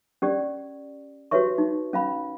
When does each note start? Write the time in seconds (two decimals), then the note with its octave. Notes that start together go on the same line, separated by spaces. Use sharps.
0.22 C#4 G4 D5
1.31 F#4 G4 B4 C#5 E5 C#6
1.58 D#4
1.93 C#4 F5 B5